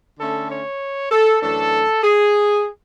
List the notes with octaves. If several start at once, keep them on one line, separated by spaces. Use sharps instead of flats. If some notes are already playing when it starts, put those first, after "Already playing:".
D3 A3 C#4 A4
C#5
A4
F#2 E3 A3 D4 A4
G#4